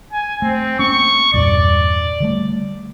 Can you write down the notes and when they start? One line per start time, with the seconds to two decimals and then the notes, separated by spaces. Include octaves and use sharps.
0.12 G#5
0.42 A3 C4
0.79 A#3 C4 C#4 C#6
1.34 E2 G2 A#2 D5
2.20 D3 G3 A3